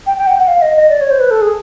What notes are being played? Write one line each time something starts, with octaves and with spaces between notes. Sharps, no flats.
G5
G5
F#5
F#5
F5
D#5
D#5
D5
C#5
C5
B4
A4
G#4